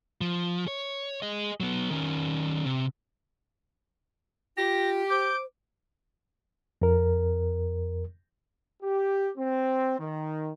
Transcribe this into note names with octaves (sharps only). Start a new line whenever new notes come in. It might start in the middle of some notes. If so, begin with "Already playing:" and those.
F3
C#5
G#4 D#5
F#3 B3
D#3 C#4
C3
F4 G4 A#6
C5 D6 G6
F2 A#4
G4
C4
D#3